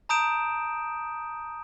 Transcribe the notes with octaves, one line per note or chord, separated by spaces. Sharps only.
A5 A#5 D#6 G6 D7 E7